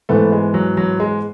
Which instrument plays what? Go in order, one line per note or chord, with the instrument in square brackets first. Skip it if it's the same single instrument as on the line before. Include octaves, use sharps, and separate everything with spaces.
[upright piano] G#2 E3 B3 [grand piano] A3
[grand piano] G#3
F#3
F#3
G#3